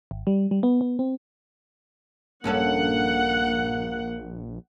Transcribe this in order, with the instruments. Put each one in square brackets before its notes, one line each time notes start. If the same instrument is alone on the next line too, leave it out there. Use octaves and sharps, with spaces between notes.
[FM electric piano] G#1
G3
G3
B3
B3
C4
[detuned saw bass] A#1 [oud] G2 C#4 A4 [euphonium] A#3 [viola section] F#5